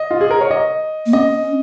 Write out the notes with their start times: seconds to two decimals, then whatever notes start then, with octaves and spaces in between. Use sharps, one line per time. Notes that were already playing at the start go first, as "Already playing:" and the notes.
Already playing: D#5
0.11 F4
0.21 G#4
0.31 A#4
0.41 C#5
0.51 D#5
1.06 A#3
1.13 C#4 D#5